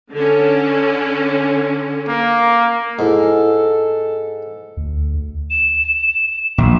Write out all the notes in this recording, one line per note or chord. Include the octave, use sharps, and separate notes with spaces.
D3 C#4
A#3
G#2 E4 A4
D2
E7
A#1